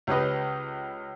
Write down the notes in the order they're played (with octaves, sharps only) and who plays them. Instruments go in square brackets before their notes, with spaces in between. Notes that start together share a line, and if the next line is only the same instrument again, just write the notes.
[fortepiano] C#2 C#4 G4 B4 D#5